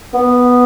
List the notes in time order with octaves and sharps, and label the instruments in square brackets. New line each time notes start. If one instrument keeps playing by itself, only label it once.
[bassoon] B3